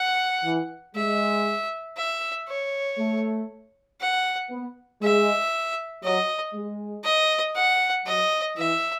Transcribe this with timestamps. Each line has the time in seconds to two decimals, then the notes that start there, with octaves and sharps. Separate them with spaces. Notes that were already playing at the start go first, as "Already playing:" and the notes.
Already playing: F#5
0.45 E3
0.96 G#3 E5
1.97 E5
2.48 C#5
2.99 A3
4.01 F#5
4.51 B3
5.02 G#3 E5
6.03 F#3 D#5
6.54 G#3
7.04 D#5
7.55 F#5
8.06 F#3 D#5
8.57 E3 E5